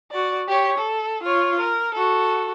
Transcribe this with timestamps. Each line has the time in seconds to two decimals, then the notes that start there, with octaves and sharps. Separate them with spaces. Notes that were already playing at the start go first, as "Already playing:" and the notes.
0.12 F#4 D5
0.48 G4 C#5
0.78 A4
1.23 F4 C#5
1.60 A#4
1.94 F#4 A4